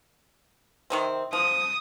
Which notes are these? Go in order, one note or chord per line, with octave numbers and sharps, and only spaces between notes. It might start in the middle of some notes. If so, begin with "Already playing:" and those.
C3 D#3 C4
F3 D#6